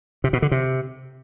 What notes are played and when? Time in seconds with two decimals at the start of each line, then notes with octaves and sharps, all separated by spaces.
0.24 C3
0.33 B2
0.42 D3
0.52 C3